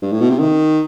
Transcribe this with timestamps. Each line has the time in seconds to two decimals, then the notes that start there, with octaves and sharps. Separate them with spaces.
0.02 G2
0.12 A2
0.20 B2
0.30 C3
0.39 D#3